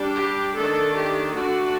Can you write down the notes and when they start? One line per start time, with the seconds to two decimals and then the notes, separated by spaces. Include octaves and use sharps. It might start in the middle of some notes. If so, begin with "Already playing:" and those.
Already playing: G3 D4
0.16 G4
0.56 D#3 A3 D4 A4
0.96 G4
1.36 D3 A3 D4 F#4